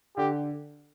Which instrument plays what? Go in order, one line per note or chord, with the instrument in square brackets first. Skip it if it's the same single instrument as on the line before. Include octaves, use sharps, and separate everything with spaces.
[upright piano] D3 [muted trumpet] G4